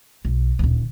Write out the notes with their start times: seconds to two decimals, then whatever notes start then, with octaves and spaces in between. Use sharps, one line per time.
0.25 B1
0.59 D#1 D2